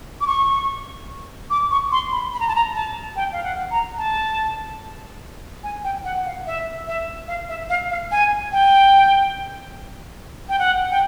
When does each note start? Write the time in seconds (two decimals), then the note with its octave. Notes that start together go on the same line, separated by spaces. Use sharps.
0.21 D6
0.27 C#6
1.50 D6
1.71 C#6
1.92 C6
2.12 B5
2.34 B5
2.40 A#5
2.48 A5
2.55 A#5
2.74 A5
3.16 G5
3.32 F5
3.44 F#5
3.71 A#5
3.98 A5
5.63 G#5
5.84 G5
6.04 F#5
6.25 F5
6.46 E5
6.87 E5
7.28 F5
7.49 E5
7.69 F5
7.90 F5
8.11 G#5
8.52 G5
10.49 G5
10.59 F#5
10.90 G5